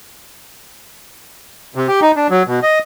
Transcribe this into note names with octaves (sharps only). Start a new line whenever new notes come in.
C3
G4
D#4
D4
F#3
B2
D#5